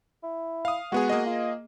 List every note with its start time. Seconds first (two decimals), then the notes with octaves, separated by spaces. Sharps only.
0.23 E4
0.65 F5 D#6
0.92 G#3 B3 F#4 G#4
1.09 A#3 G#4 D#5
1.26 F4